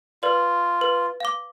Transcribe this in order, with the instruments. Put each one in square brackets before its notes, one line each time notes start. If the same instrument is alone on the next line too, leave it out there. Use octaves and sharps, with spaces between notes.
[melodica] F4 [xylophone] B4 D5
[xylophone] B4
F5 D6